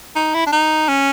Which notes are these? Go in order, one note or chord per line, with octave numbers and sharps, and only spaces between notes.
D#4
E4
D4
D#4
C#4